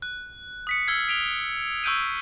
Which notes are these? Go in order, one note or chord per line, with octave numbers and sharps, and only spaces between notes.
F#6
D#6 B6 C#7
E6 F6 G#6 C7
B6 D7 F7 G7
C#6 E6 F#6 G6 D7 D#7